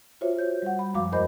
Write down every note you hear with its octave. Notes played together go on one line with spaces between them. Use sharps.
F4 F#4 C5 C#5 E5
G6
G3 F#5
B5
F#2 F3 G#3 F#4 F5 D6
E2 A#4 C5 D#5 B5 G6